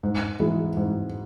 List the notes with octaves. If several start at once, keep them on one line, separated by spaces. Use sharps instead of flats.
G#2
E3 G#3
G#2